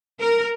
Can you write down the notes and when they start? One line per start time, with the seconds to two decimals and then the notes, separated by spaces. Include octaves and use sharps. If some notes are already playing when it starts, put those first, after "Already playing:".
0.20 A#4